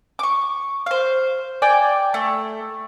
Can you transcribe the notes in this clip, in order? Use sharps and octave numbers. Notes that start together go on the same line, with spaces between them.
C#6 D6
C5 F5
D5 G5 G#5
A3